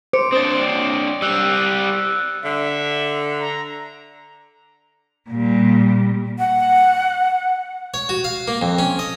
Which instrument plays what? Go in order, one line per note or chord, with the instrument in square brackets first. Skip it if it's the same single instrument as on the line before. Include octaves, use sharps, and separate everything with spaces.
[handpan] C5 [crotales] D6 C#7 D7
[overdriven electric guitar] C4 D4 [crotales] D#6 A6
[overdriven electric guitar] G3 C4 [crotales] E6 F#6
[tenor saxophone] D3 [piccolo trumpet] E5
[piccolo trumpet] A#5
[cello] A#2 G3
[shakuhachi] F#5
[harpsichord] C#5
F#4
F5
A#3
F2
C#4
D#5